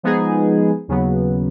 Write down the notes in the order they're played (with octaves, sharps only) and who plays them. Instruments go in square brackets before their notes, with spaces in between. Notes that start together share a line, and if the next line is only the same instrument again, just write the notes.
[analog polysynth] F3 G#3 B3 D#4 G#4
D#2 C#3 F#3 B3